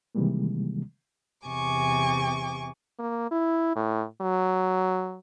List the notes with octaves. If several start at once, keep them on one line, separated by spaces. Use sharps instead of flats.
C3 D#3 E3 G3 G#3 A#3
E2 C3 G#5 C#6 D6
A#3
E4
A2
F#3